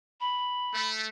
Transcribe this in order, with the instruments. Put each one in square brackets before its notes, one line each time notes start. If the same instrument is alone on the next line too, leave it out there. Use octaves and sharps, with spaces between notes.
[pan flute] B5
[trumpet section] A3